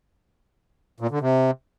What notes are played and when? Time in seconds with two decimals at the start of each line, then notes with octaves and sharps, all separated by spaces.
1.00 A#2
1.11 D3
1.21 C3